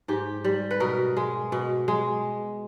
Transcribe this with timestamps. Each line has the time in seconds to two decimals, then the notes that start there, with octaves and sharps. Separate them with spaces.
0.08 G#2 G4
0.44 G3
0.71 B4
0.80 B2 A#4
1.17 G#3
1.52 B2
1.88 G#3